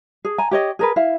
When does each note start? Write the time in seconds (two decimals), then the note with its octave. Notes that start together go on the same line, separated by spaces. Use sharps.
0.25 G#4
0.38 G#5 A#5
0.51 G4 C#5 D#5
0.79 G#4 A#4 B4
0.96 E4 F5